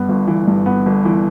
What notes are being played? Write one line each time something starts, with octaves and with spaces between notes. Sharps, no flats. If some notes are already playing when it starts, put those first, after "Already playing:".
Already playing: G2 B3
G1
E3
G2
B3
G1
E3